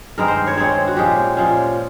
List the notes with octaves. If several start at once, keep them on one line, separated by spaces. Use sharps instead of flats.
G2 D#3 G#3 C4 A#4
C5
C#5
G2 D#3 G#3 C4 C#5
F#4
A#2 F3 G#3 C#4 G4
A#2 F3 G#3 C#4